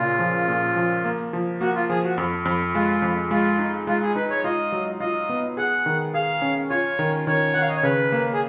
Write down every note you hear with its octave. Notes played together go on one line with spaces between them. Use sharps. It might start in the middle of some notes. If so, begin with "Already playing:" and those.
Already playing: A#2 C#3 F4
F3
A#2
F3
A#3
F3
A#3 F#4
F4
F3 G#4
F#4
F2
F2
G#3 F4
F2
G#3 F4
D#4
G#3 F4
G#4
D#4 B4
C#5
F4 D#5
F#3
F4 D#5
B3
G#4 F#5
D#3
G#4 F5
C#4
F4 C#5
D#3
D#3 C#5
D#3 F#5
F5
D#5
C#5
C#3 B4
A#3
G#4